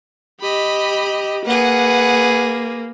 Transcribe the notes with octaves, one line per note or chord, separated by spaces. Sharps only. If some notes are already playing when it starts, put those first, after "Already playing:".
G4 D#5 B5
A#3 G#4 B4 F#5